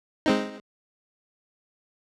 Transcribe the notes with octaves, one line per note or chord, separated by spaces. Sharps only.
G#3 C4 D#4